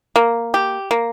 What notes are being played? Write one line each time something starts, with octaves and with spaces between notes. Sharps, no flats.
A#3
G4
A#3